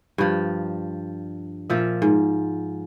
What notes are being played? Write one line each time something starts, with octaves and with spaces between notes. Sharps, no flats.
G2 F3
A#2 F3 E5
G#2